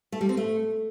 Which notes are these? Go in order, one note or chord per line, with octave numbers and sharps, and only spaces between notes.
A3
G3
C4
A3